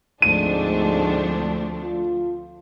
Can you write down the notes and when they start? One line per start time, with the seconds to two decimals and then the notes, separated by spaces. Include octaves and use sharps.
0.22 D2 G#2 F3 A3 C4 D4 D#7
1.83 F4